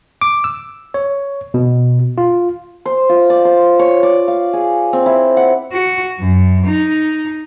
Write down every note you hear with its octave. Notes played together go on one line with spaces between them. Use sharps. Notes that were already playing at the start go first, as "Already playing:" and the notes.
D6
E6
C#5
B2
F4
C5
F4
D5
C5
C#5
D5
F5
G#4
C4
E4
F#5
F#4
F#2
D#4